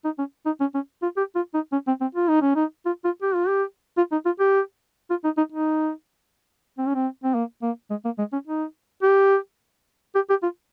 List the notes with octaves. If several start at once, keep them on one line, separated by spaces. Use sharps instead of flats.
D#4
C#4
D#4
C#4
C#4
F4
G4
F4
D#4
C#4
C4
C4
F4
D#4
C#4
D#4
F4
F4
G4
F4
G4
F4
D#4
F4
G4
F4
D#4
D#4
D#4
C4
C#4
C4
C4
A#3
A#3
G#3
A#3
G#3
C#4
D#4
G4
G4
G4
F4